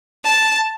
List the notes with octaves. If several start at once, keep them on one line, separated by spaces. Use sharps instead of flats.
A5